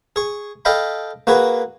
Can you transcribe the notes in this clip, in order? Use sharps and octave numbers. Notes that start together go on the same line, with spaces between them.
G#4 C#6
A4 D#5 F5 G5 B5
A#3 F#4 G#4 B4